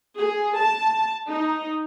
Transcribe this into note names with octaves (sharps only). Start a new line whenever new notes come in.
G#4
A5
D#4